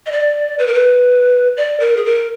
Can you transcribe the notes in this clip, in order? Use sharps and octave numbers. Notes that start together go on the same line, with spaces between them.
D#5
D5
B4
A#4
B4
D5
A#4
G#4
A#4